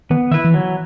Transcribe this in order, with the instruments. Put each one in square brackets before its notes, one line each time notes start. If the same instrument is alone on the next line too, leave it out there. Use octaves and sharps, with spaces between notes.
[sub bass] D#3 [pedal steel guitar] B3
[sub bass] D#3 [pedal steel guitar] E4 B4 E5
[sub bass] E3
[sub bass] D#3 [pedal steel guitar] F#3